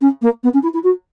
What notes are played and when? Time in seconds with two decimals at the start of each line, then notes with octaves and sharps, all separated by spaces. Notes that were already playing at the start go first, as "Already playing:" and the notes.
0.01 C#4
0.21 A#3
0.43 B3
0.53 C#4
0.63 E4
0.73 E4
0.83 F#4